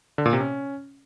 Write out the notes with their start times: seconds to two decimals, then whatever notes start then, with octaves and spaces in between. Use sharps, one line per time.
0.18 D3
0.26 A#2
0.33 C3
0.40 C#4